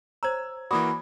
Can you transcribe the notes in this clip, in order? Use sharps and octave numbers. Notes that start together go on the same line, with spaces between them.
C5 C#5 A#5 E6 G#6
E3 A#3 F#4 D5 B5 D6 D#6